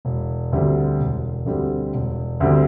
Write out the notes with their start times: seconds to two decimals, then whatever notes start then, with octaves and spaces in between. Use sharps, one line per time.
0.05 E1
0.53 D2 D3 G3 C4
1.00 E1
1.46 D2 D3 G3 C4
1.94 E1
2.40 D2 D3 G3 C4